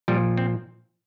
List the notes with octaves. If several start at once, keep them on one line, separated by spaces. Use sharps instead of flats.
A#2 F3 G3
C4